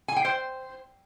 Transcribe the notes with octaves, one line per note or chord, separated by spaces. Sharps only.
G#5
G5
C5